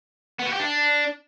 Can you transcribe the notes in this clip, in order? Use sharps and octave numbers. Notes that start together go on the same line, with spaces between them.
B3
F#4
G4
D4